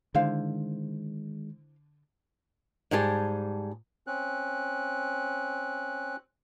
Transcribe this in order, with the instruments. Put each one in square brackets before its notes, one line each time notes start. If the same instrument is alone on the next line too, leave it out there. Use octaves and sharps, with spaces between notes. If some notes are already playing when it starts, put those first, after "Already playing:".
[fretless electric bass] D3 [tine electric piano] D#3 G#3 [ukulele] E4 C5 F5
[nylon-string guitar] G#2 G3 G4 G#4 A5
[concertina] C4 C#4 F#6